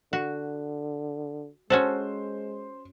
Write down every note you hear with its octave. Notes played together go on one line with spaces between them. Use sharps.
D3 F#4
G#3 C#4 F#4 A4 C5